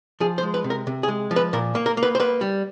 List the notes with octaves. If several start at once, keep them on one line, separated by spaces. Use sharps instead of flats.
F3 G#4
C5
G#3
B4
C3
A#4
C3
G#4
G#3
F3
B4
A#2 A#4
A#3
A#4
A#3
B4
C5
A#3 B4
G3